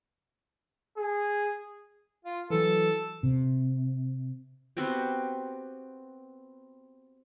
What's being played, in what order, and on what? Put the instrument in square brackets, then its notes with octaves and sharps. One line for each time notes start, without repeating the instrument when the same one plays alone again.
[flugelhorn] G#4
[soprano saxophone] F4
[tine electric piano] E3 F#3 [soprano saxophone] A4
[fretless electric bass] C3
[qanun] B3 C4 F#4 G4